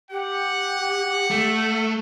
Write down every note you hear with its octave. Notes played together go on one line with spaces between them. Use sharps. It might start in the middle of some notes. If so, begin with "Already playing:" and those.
G4 F#5
A3